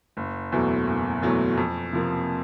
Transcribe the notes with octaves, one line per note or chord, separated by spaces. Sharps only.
F#1
E2 B2 F#3 A3
F#1
E2 B2 F#3 A3
F2
C3 F3 A#3